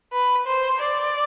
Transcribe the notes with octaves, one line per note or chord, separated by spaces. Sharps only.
B4
C5
D5